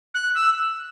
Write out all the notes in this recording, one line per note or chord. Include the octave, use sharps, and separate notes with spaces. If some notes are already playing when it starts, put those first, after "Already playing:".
F#6
E6